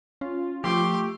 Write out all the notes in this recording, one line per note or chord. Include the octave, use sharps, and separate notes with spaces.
C#4 F4
F3 A3 G4 C6 D6